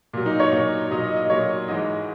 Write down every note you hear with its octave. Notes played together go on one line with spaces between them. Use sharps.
A#2 F#3
D#4
C#5
A#2 F#3
A#2 F#3 D#5
D#5
D#5
A#2 F#3 C#5
G#2 E3 G#3 D#5